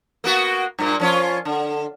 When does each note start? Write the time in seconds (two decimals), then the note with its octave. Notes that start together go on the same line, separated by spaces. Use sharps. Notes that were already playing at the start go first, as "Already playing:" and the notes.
0.24 A#3 B3 F#4
0.79 G2 A#2 A#3
1.00 F3 C#4 F4
1.45 D3